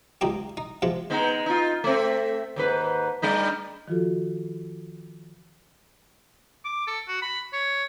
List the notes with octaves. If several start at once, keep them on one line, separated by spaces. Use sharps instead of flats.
C#2 G3 D#4 G4
D#4
C3 F3 G#3
G#3 B3 D#4
D#4 F4
A3 C4
D#2 G#2 B4
G3 D4 D#4
D#3 F3 F4 F#4 A4
D6
A4
F#4
B5
C#5